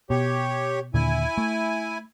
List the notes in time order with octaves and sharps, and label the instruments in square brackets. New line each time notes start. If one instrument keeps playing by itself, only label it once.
[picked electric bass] B2 [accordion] G4 C#5
[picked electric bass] D#2 A#2 D3 [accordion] E4 G#5
[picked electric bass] A3